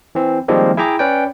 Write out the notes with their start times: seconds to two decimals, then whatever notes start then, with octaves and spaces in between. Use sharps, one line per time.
0.15 E3 C4
0.48 D#3 F3 G3 G#3 A#3 C4
0.77 E4 G#4 E5 G5 A#5 D6
0.99 C#4 B4 D5 G5